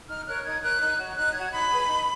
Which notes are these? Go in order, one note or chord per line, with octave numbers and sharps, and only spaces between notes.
D#4 F6
A#4 C#5 F#6
D#4 G#6
A#4 C#5 F#6
D#4
F#4 C#5
D#4 F#6
F#4 C#5 G#6
D#4 B5
G#4 B4
D#4